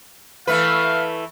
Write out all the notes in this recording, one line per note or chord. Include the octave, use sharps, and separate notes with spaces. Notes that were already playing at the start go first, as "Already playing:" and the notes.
E3 A3 B4 F5